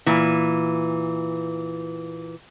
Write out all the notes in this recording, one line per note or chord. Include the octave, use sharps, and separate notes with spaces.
A#2 E3